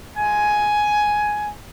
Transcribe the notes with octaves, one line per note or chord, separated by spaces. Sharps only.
G#3 F4 G#5